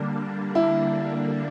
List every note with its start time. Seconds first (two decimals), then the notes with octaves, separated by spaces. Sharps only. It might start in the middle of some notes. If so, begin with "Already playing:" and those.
Already playing: D3 G3 A#3 D4
0.55 E4